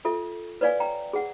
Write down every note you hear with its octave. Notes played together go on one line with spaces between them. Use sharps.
F4 A4 E5
B4 C#5 D5 F5 G#5
G5 A#5
G#4 F#5